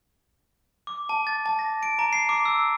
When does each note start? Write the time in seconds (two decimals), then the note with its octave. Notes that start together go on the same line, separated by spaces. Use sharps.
0.87 D6
1.09 A5
1.27 A6
1.46 A5
1.59 A#6
1.83 D7
1.99 A#5
2.13 C7
2.29 D6
2.45 E6